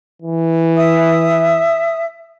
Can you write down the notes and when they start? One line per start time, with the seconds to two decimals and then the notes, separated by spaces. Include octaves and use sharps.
0.22 E3
0.77 E5 D#6